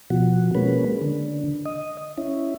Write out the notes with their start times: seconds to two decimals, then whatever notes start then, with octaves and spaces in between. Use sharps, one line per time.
0.10 B2 F3 F#4
0.55 G#3 A#3 C#4 B4
1.01 D3
1.66 D#5
2.18 C#4 E4